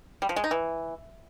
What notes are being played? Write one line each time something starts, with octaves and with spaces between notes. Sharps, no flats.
G3
F3
G#3
D#4
E3